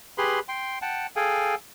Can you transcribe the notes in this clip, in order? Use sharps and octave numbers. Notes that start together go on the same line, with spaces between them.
G4 G#4 B4 B5 C6
G5 C6
F#5 G5 A5
G#4 A4 F5 G5 G#5